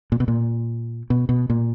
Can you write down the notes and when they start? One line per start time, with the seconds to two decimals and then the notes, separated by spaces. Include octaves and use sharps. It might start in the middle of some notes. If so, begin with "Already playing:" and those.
0.12 A#2
0.20 B2
0.28 A#2
1.10 B2
1.29 B2
1.50 A#2